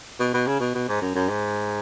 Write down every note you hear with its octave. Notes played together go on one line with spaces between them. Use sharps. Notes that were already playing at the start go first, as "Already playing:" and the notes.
B2
B2
C#3
B2
B2
G#2
F#2
F#2
G#2